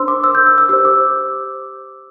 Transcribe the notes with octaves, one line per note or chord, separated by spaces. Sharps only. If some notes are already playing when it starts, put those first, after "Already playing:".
Already playing: D4 C5 C6 E6
D6
E6
G6
E6
E6
G4 C5 E6
D6